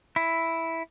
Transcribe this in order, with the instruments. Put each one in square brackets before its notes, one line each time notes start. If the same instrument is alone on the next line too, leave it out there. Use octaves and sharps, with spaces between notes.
[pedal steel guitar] E4